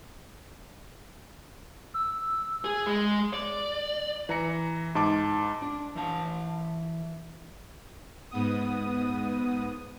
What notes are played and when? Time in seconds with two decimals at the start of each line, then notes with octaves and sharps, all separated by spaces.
1.94 E6
2.65 G#4
2.87 G#3
3.33 D5
4.29 E3 A#5 C#7
4.95 G#2 A5 D6
5.62 D4
5.95 E3 E4 A5
8.31 G#2 B3 D#6